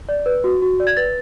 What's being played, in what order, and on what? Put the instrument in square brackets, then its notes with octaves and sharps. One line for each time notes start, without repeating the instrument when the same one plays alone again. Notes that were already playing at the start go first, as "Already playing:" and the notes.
[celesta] D5
B4
F#4
F#4
D5
G#6
B4 A6